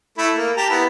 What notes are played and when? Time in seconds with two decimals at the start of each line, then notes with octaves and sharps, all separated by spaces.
0.18 A3 E4
0.36 A#3
0.57 G4 A5 A#5
0.70 B3 E4